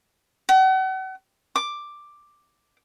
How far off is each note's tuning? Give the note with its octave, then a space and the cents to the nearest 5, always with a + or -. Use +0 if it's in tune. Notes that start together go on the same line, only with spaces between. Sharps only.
F#5 +40
D6 +5